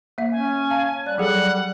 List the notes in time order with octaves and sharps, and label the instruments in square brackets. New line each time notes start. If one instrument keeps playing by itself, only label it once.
[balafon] A#3 E5
[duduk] C#4 [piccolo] G#5
[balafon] F5 A5
[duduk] G3 [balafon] D5 [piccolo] F#6
[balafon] F#3 G#4 A4 [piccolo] F#5